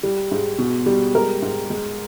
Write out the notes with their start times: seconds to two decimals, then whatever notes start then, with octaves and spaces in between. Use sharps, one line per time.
0.03 G3
0.31 G#2
0.58 B2
0.86 G3
1.14 G#3 A#4
1.42 G#2
1.70 G#3